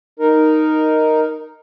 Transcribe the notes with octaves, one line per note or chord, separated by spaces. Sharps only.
D#4 A#4